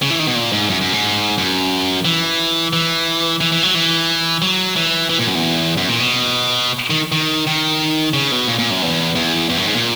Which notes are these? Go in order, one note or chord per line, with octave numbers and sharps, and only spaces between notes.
C#3
E3
D#3
B2
A#2
G#2
F#2
F#2
G#2
F#2
E3
E3
E3
E3
F#3
E3
F#3
E3
E3
A#2
F#2
E2
F#2
A#2
B2
D#3
D#3
D#3
C#3
B2
A#2
A#2
F#2
E2
E2
E2
F#2
G#2
A#2